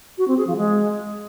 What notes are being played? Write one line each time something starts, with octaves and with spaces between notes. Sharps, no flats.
F#4
C4
G#4
F3
G#3